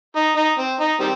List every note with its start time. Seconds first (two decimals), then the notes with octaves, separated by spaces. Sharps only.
0.16 D#4
0.36 D#4
0.58 C4
0.80 D#4
1.00 D#3 G3 C4